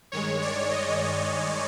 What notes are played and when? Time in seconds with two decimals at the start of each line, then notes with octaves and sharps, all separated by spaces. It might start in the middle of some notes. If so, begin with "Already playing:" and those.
0.12 G2 D#3 G#3 C#5
0.42 D5
0.72 D#5